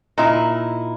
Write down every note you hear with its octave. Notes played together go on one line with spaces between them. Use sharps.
A#2 D#4 E4